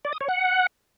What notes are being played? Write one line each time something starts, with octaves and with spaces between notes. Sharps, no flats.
D5
D#6
C#5
F#5